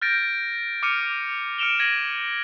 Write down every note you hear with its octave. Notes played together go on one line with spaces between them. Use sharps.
F6 G6 A6 A#6 D7
D6 F6 C#7 D#7
F6 C#7 D7 E7 F7 G7
G#6 A#6 D#7 F#7